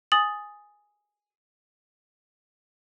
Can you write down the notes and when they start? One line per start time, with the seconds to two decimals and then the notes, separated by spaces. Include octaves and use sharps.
0.12 G#5 D#6 A6 F#7